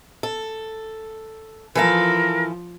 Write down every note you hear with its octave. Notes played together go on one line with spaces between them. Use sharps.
A4
E3 F3 A4 A#4 F5